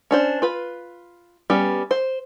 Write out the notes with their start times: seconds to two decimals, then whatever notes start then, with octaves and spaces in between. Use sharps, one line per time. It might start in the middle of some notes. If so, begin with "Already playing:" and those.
0.11 C#4 D4 C5
0.42 F4 B4
1.50 G3 B3 C#4
1.91 C5